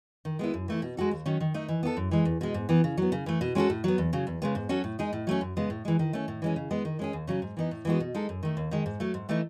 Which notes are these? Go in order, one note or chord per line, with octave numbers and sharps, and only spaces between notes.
D#3
G#3 B3 E4
F#2
E3 A3 E4
B2
G#3 D#4 F#4 A4
D#2
D#3 F#3 C#4
D#3
A3 D#4
E3
B3 F#4 A4
F#2
E3 G#3
E2
B2 G#3
G#2
E3 B3
C#3
F#3 B3
C#3
E3 A3
B2
G#3 C#4 F#4 A4
A2
F#3 B3
E2
C#3 F#3
E2
C#3 G#3 B3
G#2
F#3 C#4 F#4 A4
A2
G#3 D#4 G#4
A2
F#3 A3 C#4
F#2
C#3 G#3 B3
A2
E3 G#3
D#3
A3 C#4
A2
E3 G#3 C#4
C#3
G#3 B3
D#3
G#3 C#4 G#4
D#2
C#3 F#3 C#4
G#2
E3 B3 D#4
A2
E3 G#3 B3 F#4
B2
G#3 D#4 A4
F#2
D#3 A3
D#2
D#3 G#3
G#2
F#3 A3
G#2
E3 A3 D#4